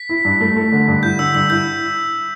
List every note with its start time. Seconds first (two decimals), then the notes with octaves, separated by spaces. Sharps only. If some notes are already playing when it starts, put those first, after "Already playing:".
Already playing: B6
0.09 E4
0.25 G2
0.41 A3
0.56 A3
0.72 D3
0.88 G2
1.03 E4 G6
1.19 D3 E6
1.35 G2 E6
1.50 E4 G6